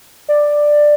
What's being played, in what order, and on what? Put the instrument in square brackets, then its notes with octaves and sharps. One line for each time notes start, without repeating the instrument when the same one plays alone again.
[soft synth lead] D5